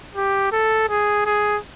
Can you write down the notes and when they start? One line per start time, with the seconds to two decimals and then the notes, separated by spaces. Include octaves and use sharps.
0.16 G4
0.52 A4
0.89 G#4
1.26 G#4